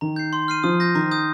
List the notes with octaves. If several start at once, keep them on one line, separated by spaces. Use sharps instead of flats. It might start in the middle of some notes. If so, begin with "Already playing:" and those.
D#3 A#5
G6 C7
C6
F6 C7 D#7
F3 D#6
G6 A#6
D#3 A#5
D#6 G6